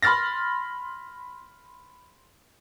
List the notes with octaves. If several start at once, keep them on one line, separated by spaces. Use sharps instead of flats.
B5 C6 F6 A6 A#6